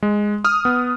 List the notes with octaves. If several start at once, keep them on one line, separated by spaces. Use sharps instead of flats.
G#3
D#6 F6
B3